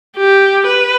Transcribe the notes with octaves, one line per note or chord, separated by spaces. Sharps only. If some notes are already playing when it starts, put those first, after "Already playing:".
G4
B4